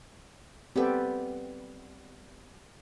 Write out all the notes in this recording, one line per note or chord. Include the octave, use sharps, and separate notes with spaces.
G3 B3 C4 G4 A4